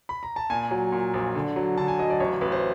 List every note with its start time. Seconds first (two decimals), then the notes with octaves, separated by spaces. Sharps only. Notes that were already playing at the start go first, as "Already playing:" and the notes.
0.09 B5
0.23 A#5
0.36 A5
0.50 A#2 G#5
0.71 F#3
0.92 A#2
1.14 A#1
1.35 D3
1.56 F#3
1.77 D3 A5
1.88 G#5
1.99 F#3 D#5
2.10 D5
2.20 A1 C#5
2.41 A1 B4
2.52 C5